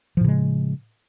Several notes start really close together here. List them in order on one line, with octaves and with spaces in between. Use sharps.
F3 A2 C#3 G#3